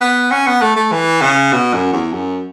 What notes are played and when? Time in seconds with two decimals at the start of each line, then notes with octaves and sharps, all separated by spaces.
0.01 B3
0.31 C#4
0.47 B3
0.62 A3
0.76 A3
0.92 E3
1.22 C#3
1.53 B2
1.73 F#2
1.93 E2
2.13 F#2